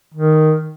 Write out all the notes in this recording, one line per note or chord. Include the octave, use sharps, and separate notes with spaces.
D#3